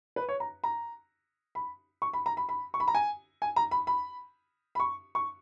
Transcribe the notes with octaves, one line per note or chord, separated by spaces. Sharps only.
B4
C#5
A#5
A#5
B5
C#6
B5
A#5
B5
B5
C#6
B5
A#5
G#5
G#5
A#5
B5
B5
B5
C#6
C#6